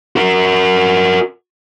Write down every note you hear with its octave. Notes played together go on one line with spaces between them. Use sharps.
F#4 A#4